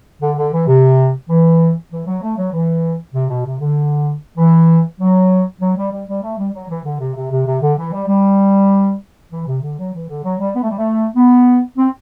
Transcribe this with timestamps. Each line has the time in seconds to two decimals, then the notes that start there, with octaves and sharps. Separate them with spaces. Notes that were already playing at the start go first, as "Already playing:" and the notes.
0.22 D3
0.37 D3
0.53 E3
0.68 C3
1.29 E3
1.92 E3
2.07 F#3
2.22 A3
2.38 F#3
2.53 E3
3.15 C3
3.30 B2
3.45 C3
3.60 D3
4.38 E3
5.00 F#3
5.61 F#3
5.77 G3
5.92 G3
6.08 G3
6.23 A3
6.38 G3
6.54 F#3
6.70 E3
6.85 D3
7.00 C3
7.16 C3
7.31 C3
7.47 C3
7.62 D3
7.78 E3
7.93 G3
8.08 G3
9.31 E3
9.47 C3
9.62 D3
9.78 F#3
9.94 E3
10.09 D3
10.24 F#3
10.40 G3
10.55 B3
10.63 A3
10.70 G3
10.78 A3
11.16 B3
11.78 C4